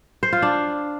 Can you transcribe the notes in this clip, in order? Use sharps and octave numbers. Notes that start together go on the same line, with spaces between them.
C5
F4
D4